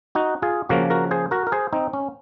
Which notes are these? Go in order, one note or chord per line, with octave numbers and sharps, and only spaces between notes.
D#4 F#4
F4 G#4
C#3 F3 A#3 F#4 A#4
F#4 A#4
G#4 C5
F#4 A#4
A#4
G#4 C5
C4 D#4
C#4